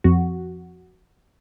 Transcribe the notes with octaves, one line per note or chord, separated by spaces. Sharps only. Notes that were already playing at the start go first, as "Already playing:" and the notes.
F2 F#4